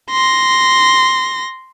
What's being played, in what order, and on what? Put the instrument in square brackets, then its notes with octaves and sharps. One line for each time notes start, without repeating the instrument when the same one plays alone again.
[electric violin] C6 A#6